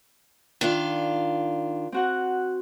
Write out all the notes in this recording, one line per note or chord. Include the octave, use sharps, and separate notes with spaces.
D#3 D4 F4
C4 F#4 F#5